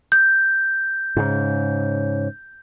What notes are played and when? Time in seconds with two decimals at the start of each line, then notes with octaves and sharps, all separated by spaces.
0.12 G6
1.17 G#2 C#3